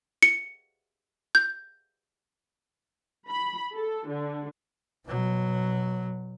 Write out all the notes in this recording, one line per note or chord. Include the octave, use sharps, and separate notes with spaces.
C#7
G6
B5
A4
D3
B2 F#3